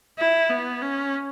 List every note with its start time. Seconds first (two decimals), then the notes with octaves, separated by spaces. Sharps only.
0.19 E4
0.50 B3
0.82 C#4